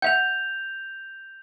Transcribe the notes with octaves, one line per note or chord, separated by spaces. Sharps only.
E5 F#5 G6 F7